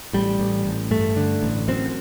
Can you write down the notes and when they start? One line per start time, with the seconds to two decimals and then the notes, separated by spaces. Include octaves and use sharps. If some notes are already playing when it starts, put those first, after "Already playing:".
0.13 A1 G3
0.40 A1
0.66 A1
0.91 G2 A3
1.16 D3
1.43 A1
1.68 F#2 C4